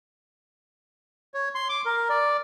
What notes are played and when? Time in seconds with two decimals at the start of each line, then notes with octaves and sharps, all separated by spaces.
1.34 C#5
1.55 C6
1.69 D6
1.85 A#4
2.09 D5